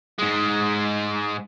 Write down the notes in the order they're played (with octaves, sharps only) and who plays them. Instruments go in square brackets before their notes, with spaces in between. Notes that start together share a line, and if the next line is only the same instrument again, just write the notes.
[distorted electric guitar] G#2 G#3